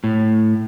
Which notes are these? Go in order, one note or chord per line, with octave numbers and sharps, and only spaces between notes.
A2